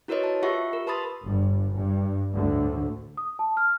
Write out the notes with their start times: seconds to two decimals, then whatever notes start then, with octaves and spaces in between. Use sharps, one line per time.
0.08 E4 F#4 A#4 B4 C#5 D#5
0.24 A5
0.42 F4 G4 E5 F#5 C#6
0.73 A#4
0.87 B4 A5 B5 C6 D#6 A6
1.24 G1 G2
1.75 G2
2.33 D2 A2 D3
3.17 D#6
3.39 A5
3.57 F6